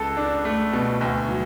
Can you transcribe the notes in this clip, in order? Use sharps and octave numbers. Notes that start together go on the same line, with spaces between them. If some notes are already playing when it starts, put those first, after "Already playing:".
Already playing: C#2 A4
D4
A3
B2
D2
F#3